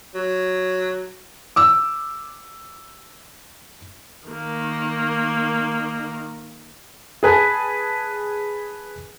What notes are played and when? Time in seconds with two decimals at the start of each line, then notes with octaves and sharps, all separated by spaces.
0.15 F#3
1.56 D6 E6
4.28 D#3 A#3
7.23 G#4 B4 G#5 A5